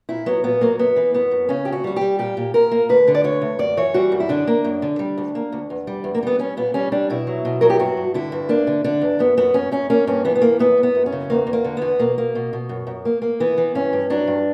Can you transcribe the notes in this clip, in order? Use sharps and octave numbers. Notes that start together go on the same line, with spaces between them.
A#2 E4
F#3 B3
A#2 B3
F#3 A#3
F#2 B3
E3
F#2 B3
F#2
C#3 C#4
D2 G4
F#4
G3 F#4
G3 G4
A#2 G4
A#2
A#2 A#4
A#3
D2 B4
D3
D5
D2 C#5
D2
F#2 D5
E3 C#5
G3 F#4
F#2
E4
D3 D4
A#3
F#2
D3
G3
D2
A#3
D2
E2
G3
E2
A#3
G3 B3
G3 C#4
A#2 B3
G3 C#4
G3 D4
B2 E4
F#3
B2
F#3 A#4
G4
G2 F#4
G2
D3 E4
G2
A#3 D4
D3
D3 D4
E2
F#2 B3
F#2 B3
F#2 C#4
F#2 C#4
A#3 C#4
G2 C#4
E3 B3
B3
G2 A#3
F#2 B3
F#2
B3
F#2
C#4
C#3
E2 A#3
E2
A#3
D3
E2 B3
B2 A#3
A#3
B2
B2
F#2
F#2
A#3
A#3
E3 B3
E3
G2 C#4
G2
F#3 D4
G2